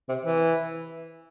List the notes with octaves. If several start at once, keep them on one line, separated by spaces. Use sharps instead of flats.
C3
E3